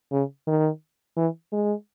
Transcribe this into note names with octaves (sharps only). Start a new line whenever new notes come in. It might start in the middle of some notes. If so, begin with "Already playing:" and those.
C#3
D#3
E3
G#3